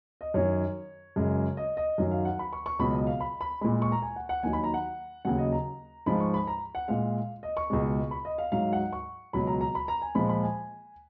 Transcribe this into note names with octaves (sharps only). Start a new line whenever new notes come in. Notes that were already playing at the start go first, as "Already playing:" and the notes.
D#5
F#2 D#3 F#3 C#5
F#2 C#3 G#3
D#5
D#5
F#2 D#3 F#3
F5
F#5
B5
C#6
C#6
C#2 B2 F#3 B5
D#5
F5
B5
B5
A#2 G#3 B5
C#6
A#5
G#5
F#5
F#5
D#2 D#3 F#3 G#5
B5
A#5
F#5
D#2 C#3 F#3 F#5
D#5
A#5
G#2 F3 G#3 B5
C#6
B5
A#5
F#5
A#2 G#3 F5
D#5
C#6
C#2 B2 G#3
B5
D#5
F5
G#2 F#3 F5
F#5
C#6
C#2 B2 F#3 B5
A#5
A#5
B5
A#5
G#5
A#2 F3 G#3 B5
B5
G#5